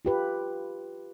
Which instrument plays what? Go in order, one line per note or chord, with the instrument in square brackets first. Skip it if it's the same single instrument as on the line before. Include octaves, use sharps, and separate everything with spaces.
[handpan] F4 G4 B4